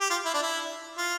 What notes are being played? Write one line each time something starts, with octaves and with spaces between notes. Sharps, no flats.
G4
F4
E4
D4
E4
F4